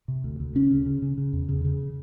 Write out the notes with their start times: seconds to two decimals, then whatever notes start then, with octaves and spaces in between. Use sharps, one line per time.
0.08 C3
0.24 D2
0.40 D2
0.55 C#3 C#4
0.71 C#3
0.86 C#3
1.02 C#3
1.18 C#3
1.33 E2
1.49 C#3
1.65 C#3